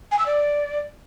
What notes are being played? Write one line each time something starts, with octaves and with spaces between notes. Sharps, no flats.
G#5
E6
D5